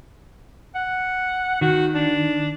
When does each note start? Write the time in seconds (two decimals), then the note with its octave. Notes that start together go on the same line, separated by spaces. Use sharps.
0.75 F#5
1.61 D#3 F#4
1.95 D4